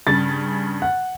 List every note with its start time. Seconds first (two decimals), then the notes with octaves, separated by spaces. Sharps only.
0.07 G2 C#3 A6
0.82 F#5